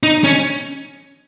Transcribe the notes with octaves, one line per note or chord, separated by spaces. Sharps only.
D#4
C#4